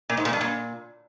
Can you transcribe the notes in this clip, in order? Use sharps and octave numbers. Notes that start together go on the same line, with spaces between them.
A#2
G#2
A#2
G2
A#2